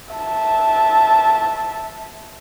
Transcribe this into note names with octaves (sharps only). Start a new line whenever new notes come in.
E5 A5